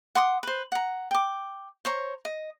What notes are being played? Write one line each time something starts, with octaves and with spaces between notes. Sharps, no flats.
F#5 C6 D6 D#6
B4 C5
F#5 A#5
G5 D6
C5 C#5 A#5
D#5